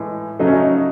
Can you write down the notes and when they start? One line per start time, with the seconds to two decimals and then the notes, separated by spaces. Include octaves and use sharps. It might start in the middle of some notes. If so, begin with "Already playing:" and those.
Already playing: A2 E3 G#3
0.39 C#3 F#3 A3 D#4
0.47 C#4
0.53 D#4